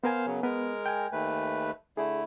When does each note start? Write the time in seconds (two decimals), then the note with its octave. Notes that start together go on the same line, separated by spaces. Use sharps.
0.04 B3 A#4 C5 F5 G#5
0.26 C#3 F#3
0.43 G#3 B3 A#4 B4
0.86 G5 G#5
1.12 D#2 A3 B4
1.97 D3 A3 E4 G#4